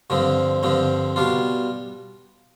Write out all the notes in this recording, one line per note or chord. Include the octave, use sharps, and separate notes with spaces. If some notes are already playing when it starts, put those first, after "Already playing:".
G2 D3 F3 C4
G2 D3 F3 C4
B2 G3 D4 F4